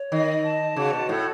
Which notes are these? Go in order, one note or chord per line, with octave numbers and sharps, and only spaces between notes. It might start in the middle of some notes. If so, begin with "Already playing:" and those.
Already playing: C#5
D#3 D#5
A5
C#3 F#4
B2
A2 A4